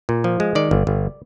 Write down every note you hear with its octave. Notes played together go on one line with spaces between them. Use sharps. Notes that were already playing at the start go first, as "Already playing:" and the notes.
A#2
F3
G#3
D#3 D5
G1
G1